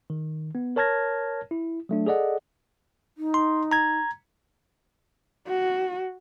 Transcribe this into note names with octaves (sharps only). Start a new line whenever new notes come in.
D#3
B3
A#4 C#5 A5 F6 G#6 A#6
E4
F#3 A3 D4
G#4 A4 D5 D#5 F#5
D#4
C6
A#5 G#6
F#4